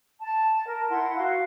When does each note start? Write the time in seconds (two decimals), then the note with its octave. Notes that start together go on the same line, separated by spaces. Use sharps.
0.20 A5
0.66 A#4
0.89 E4 F#5 C6
1.16 F#4 F5